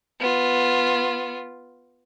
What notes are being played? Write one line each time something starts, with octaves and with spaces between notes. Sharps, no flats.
B3 F4